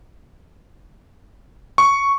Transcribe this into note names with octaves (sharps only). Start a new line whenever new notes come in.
C#6